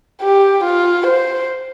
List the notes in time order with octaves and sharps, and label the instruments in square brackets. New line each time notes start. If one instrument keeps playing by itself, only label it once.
[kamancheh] G4
F4
C5